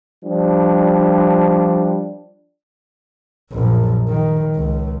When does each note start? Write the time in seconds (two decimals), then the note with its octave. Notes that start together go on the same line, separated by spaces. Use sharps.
0.24 F3 G3 D4
3.51 A#1 F#2
4.08 D#3
4.55 C#2